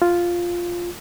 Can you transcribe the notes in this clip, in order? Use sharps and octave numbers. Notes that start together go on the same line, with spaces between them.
F4